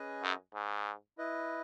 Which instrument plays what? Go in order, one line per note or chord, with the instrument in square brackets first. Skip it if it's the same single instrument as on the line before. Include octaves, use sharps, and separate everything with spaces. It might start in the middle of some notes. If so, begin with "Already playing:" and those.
Already playing: [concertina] C#4 G#4 B4 D#5 G#5
[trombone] F#2
G#2
[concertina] E4 B4 D#5